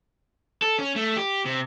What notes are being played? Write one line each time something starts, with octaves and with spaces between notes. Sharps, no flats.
A4
C#4
A3
G4
C3